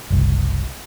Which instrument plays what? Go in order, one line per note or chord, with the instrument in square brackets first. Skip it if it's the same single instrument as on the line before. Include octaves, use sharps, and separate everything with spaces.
[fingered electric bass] F#1 C2